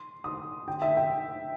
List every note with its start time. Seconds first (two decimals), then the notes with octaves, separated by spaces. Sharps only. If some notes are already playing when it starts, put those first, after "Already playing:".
Already playing: C6
0.24 D#6
0.68 G5
0.82 E5
0.97 G5